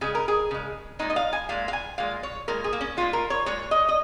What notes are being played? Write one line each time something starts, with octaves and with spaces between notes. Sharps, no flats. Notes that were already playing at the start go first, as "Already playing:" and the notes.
C#3 G#3 G#4
A#4
G#4
C#3 G#3
A#2 G#3 D#4
D#5
F5
G#5
A#2 G#3 F5
F5
G#5
A#2 G#3 F5
C#5
A#2 G#3 A#4
G#4
A#3
C#4
A#2 G#3 F4
A#4
C#5
A#2 G#3 C#5
D#5
D#5